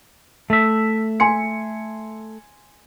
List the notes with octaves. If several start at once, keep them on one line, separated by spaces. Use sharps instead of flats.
A3 E5
G#5 C6 C#7